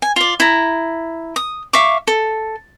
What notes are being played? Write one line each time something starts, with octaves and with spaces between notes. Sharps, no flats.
G#5
F4 D5
E4 A#5
D#6
E5 F5 C#6 D6
A4